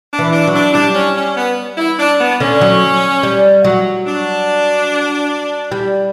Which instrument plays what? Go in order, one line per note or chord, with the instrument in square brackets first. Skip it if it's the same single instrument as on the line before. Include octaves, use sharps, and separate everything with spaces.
[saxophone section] D4
[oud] E3
[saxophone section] D4
[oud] F#3
[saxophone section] D4
[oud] G3 [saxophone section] D4
[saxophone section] C#4
C#4
B3
E4
D4
B3
[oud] D3 [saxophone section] C#4
[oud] F#3
G3
F#3
[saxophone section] D4
[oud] G3